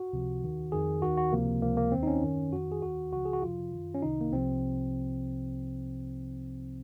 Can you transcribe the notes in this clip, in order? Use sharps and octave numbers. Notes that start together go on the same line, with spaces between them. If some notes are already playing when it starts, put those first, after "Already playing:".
Already playing: F#4
C#2 C3 F3
D#2 D#3
F2 D#3 G#4
D#2 D#3 F#4
F#4
C#2 C3 F3 A#3
C#2 C3 F3 A#3
A#3
D#2 D#3 C4
D#4
C#4
F#2 D#3
F2 D#3 F#4
G#4
D#2 D#3 F#4
C#2 C#3 F3 F#4
G#4
F#4
F2 C3 F3 F4
F#2 D#3
C#4
C2 C3 D#3 D#4
A#3
C2 C3 F3 C4